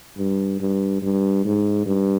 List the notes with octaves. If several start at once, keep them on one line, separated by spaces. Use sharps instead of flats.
G2
G2
G2
G#2
G2